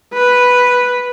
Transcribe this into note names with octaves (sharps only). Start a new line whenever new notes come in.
B4